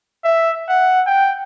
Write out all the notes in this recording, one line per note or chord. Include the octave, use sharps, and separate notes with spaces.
E5
F#5
G5